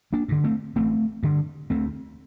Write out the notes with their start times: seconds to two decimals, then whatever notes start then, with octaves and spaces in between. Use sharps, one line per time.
0.13 A#3 D4
0.28 G2 D3
0.44 A3 C4
0.76 A1 A3 C4
1.23 G2 D3
1.70 D2 A3 C4